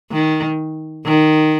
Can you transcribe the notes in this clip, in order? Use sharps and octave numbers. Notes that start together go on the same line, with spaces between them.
D#3
D#3